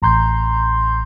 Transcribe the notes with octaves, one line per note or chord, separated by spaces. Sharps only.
A1 A#5 C6 G6